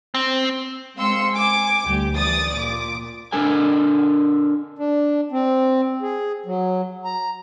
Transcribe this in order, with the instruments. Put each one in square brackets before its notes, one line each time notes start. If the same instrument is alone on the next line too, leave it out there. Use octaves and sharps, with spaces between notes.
[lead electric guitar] C4
[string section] G#3 C4 F5 C6 E6 C#7
G#5 D6
D2 G3 G4
E3 D5 D#6 A6
A#2 D6
[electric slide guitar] D4 A4 A#4 G#5
[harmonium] D4
C4
G#4
F#3
A#5